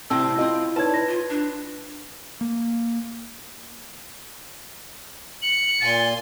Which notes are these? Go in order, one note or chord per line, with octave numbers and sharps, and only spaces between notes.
A2 C3 G3 C4 E4 E6
C4 F4 D#5
D#4 B4 C#5 D5 A5 G#6
B4 A#6
F4
D4
A#3
C#7 F#7
A#2 G#5 C6 A6